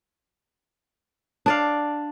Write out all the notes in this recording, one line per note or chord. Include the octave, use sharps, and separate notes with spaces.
D4 D5 F5